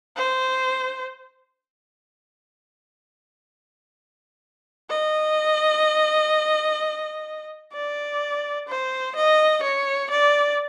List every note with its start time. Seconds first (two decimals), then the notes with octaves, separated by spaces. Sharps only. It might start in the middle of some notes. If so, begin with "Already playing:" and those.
0.17 C5
4.89 D#5
7.73 D5
8.68 C5
9.16 D#5
9.63 C#5
10.10 D5